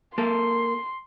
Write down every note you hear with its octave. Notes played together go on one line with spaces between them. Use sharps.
A#3 A4 C6